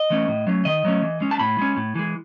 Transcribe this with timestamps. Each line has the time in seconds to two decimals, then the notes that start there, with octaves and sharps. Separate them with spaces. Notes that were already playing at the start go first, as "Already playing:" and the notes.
Already playing: D#5
0.10 E3 A3 C#4
0.28 A2
0.47 F#3 A3 C#4
0.65 D#3 D#5
0.85 F#3 A3 C#4
1.02 E3
1.21 G#3 C#4
1.31 A5
1.39 A2 B5
1.58 G#3 C#4
1.77 A2
1.95 E3 G#3